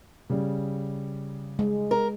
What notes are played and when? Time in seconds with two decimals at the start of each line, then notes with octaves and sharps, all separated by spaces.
0.30 C#3 G3
1.59 G#3
1.91 A#4